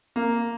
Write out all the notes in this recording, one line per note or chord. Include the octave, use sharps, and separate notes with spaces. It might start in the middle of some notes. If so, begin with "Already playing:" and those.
A#3